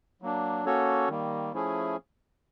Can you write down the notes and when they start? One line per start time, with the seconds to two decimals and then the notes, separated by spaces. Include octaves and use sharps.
0.22 F#3 A#3 D4
0.66 A#3 C#4 F#4 A4 C#5
1.09 D#3 G3 A#3
1.53 F3 A3 C#4 E4 G#4